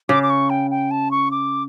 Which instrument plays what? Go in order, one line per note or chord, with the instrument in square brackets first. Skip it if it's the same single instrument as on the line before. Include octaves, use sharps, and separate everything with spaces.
[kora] C#3 [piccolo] D6
[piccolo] D6
C#6
G5
G5
A5
C#6
D6